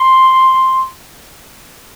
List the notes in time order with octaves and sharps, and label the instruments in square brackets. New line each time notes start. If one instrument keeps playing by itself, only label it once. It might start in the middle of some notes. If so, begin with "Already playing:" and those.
Already playing: [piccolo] C6